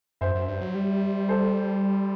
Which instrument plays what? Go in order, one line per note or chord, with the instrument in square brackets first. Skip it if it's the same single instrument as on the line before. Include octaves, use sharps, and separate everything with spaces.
[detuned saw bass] F#2 [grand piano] C5 E5
[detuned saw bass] F#2
G2
F#3
G3
[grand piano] A4 C5